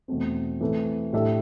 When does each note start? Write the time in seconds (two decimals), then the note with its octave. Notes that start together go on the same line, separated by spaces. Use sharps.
0.08 E2 B2 A3 C4
0.60 E3 A3 C4 E4 A4
1.13 A2 G3 D4 A4 E5